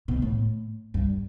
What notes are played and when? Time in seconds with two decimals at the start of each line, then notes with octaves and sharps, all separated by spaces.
0.08 B2
0.22 A2
0.94 G2